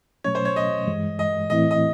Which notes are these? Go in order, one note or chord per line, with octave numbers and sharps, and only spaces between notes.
B2 F#3 A3 C#4 C#5
C5
C#5
D#5
G2 E3 G#3
D#5
A2 E3 A3 C4 E4 D#5
D#5